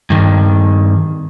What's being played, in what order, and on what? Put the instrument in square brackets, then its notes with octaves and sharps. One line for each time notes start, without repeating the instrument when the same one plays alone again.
[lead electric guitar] G2 D#3